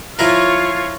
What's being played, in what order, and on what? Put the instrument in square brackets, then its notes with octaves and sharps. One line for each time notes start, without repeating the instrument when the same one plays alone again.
[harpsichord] F3 E4 A#4 [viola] F4 C#5